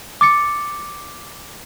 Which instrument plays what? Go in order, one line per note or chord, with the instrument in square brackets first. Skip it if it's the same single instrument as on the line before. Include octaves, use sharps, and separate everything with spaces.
[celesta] D6 A6 C#7